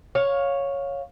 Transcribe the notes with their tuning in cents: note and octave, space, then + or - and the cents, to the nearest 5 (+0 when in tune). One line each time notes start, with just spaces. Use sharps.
C#5 +0 F5 +15